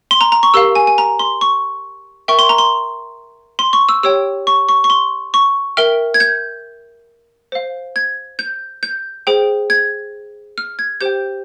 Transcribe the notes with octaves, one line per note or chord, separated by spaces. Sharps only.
C6
A#5
A#5
C#6
G4 A#4 F5 E6
G#5
G#5
A#5
C6
C#6
A#4 E5 G5 C#6
C6
A#5
C6
C6
C#6
E6
G4 C#5 G5 E6
C#6
C#6
C#6
C6
C#6
A#4 E5 G5 F6
G#6
G6
C5 F5
G#6
G6
G6
G#4 C5 G5
G#6
F6
G#6
G4 C5 G5 G6